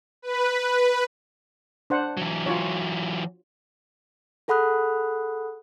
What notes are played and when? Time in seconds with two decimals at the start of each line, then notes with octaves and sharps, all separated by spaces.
0.22 B4
1.90 D4 C5 F#5
2.17 E3 F#3
2.46 F4 F#4 C#5
4.48 G#4 A4 F#5 B5 D#6 F#6